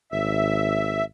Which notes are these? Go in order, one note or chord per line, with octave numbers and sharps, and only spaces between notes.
G#1 E5